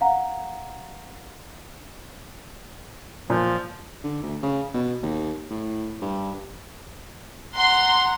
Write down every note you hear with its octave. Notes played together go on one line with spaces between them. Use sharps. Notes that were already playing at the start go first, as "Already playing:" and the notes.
F5 F#5 A#5
A#2 F3
D3
D2
C#3
B2
D#2
A2
G2
F#5 A#5 C6